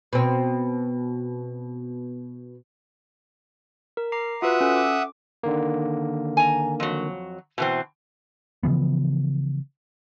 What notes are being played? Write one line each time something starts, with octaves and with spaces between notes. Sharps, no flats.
B2 C4
A#4
A#5 D6 C7
F4 F#4 B4 E5 F#5 D#6
C#4 A4
D6
D3 D#3 A#3
G#5 A#5
F2 F#3
B2 E3 C4
C#3 E3 F3 B3